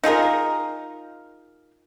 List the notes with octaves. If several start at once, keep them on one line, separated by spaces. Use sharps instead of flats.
D#4 F4 G#4 A#4